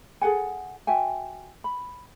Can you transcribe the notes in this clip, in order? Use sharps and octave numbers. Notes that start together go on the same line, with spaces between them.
G#4 A4 F#5 G#5
F#4 E5 G5 G#5
B5